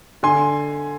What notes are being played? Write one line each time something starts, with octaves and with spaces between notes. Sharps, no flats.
D3 G#5 C6